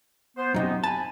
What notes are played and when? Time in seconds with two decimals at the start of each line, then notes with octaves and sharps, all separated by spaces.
0.37 B3 C5
0.54 F#2 A2 C3 B3 D#4
0.84 G#5 A5 B5